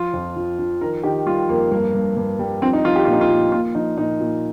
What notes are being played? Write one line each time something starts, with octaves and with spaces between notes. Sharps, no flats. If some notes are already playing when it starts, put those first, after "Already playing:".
Already playing: F3 F4
F2
F3
F3
D#3 A#4
D#3 G4
G3 F4
F2 A#3
G2 A#3
G2
G2
G3
F3 C4
D#4
F3 F4
G4
A#2 F4
D#4
F4
A#2
A#2 F4
F3 D#4
A#2 D#4
A#2